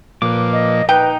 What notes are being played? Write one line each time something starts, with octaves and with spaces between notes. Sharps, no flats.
A#2 F3 B4 D6
D#5
D#4 B4 G5